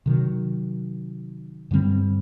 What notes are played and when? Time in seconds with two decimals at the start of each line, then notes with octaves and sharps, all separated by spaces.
0.06 C3 D#3 F#3
1.71 G2 D3 G3 C4